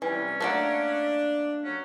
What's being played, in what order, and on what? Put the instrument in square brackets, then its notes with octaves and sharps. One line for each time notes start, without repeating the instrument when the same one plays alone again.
[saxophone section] C3 G3 [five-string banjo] E3 [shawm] C#4
[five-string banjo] A3 A#3 F#5 [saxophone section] D4
[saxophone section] F#3 [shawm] C#4